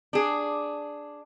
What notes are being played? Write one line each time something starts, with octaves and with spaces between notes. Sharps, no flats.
D4 G#4